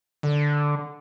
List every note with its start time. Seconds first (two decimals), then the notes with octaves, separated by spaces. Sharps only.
0.23 D3